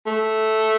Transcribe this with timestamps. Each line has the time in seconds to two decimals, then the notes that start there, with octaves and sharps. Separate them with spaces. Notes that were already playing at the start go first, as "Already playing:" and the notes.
0.07 A3